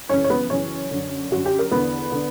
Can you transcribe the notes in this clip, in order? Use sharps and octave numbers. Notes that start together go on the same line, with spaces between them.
F#2 C#3 E3 C#4 C#5
C#5
B3 B4
F#2 C#3 E3 C#4 C#5
F#2 D3
F#2 D3 F#4
G4
A#4
E2 D3 B3 B4
D3